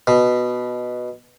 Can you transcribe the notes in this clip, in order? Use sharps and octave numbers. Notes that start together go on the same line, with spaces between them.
B2